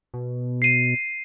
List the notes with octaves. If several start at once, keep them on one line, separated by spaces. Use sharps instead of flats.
B2
C7 D#7